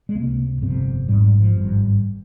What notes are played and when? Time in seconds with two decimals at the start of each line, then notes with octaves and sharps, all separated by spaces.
0.09 G#3
0.15 C#2 C3 A#3
0.62 G1 F2 C3
1.08 G#2 G3
1.11 G#1
1.24 G3
1.40 F3
1.56 G#1 G2